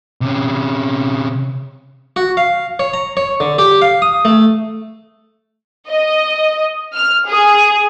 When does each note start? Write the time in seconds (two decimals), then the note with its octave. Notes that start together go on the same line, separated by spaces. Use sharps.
0.21 C3 C#4
2.16 F#4
2.37 F5
2.79 C#5
2.94 A#5
3.17 C#5
3.40 D3
3.58 G4
3.82 F5
4.02 D#6
4.25 A3
5.88 D#5
6.94 F6
7.27 G#4